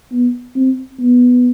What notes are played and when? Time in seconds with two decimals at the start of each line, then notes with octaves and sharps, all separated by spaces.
0.11 B3
0.56 C4
1.00 B3